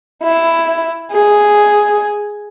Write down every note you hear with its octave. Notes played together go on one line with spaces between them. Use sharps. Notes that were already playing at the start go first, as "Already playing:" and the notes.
E4
G#4